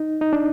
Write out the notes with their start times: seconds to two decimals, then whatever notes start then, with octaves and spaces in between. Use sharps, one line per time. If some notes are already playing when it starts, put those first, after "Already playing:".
Already playing: D#4
0.21 D#4
0.33 D4